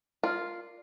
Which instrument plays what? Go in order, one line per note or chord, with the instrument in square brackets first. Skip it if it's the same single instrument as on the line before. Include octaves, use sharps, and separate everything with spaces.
[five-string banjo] F4 [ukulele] A#4 D5